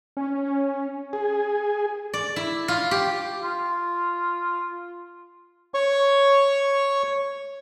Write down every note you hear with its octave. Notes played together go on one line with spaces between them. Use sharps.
C#4
G#4
D5
E4
F4
G4
F4
C#5 C#6